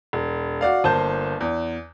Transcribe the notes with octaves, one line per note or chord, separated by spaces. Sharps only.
E1
F#4 D5 F5
G1 A#3 C5 A5 G6
E2